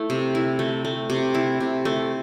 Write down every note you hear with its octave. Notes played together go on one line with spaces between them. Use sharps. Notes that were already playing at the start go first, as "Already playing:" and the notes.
Already playing: A3 E4
C3
E4
A3
A3
C3
E4
C3
A3